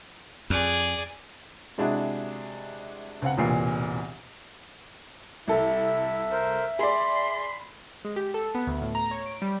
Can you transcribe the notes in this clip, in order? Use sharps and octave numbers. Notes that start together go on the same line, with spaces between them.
F2 G#4 D5
C3 G#3 D4 E4 F#4
C#2 C4 F5 F#5
E1 C2 A#2 E3 C7
C2 E4 A4 E5
A#4 C5
G#4 D5 B5 C6
G#3
G4
A4
B3
D2
A2
A#5
C#5
D7
G3